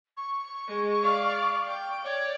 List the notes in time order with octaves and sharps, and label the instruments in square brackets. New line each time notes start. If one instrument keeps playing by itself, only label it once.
[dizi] C#6
[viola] G#3
D5 F5
G5
[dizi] C#5 [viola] D5